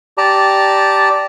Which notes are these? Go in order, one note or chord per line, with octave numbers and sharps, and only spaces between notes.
G4 D5 A5 A#5